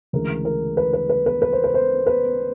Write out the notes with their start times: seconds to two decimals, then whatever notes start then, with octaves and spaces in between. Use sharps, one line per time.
0.13 D2 C#3 E3 G#3 A#4
0.45 A#4
0.77 B4
0.93 B4
1.09 B4
1.26 B4
1.42 B4
1.53 C5
1.64 B4
1.74 C5
2.07 B4